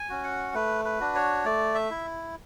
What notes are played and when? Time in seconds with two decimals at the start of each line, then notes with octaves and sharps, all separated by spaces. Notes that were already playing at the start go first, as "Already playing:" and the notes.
Already playing: G#5
0.10 C#4 F#4
0.24 F#5
0.54 A3 B4
0.85 B4
1.00 D4 F#4
1.15 C#5
1.45 A3 D5
1.75 E5
1.90 E4